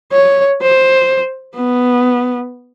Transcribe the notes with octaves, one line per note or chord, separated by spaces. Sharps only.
C#5
C5
B3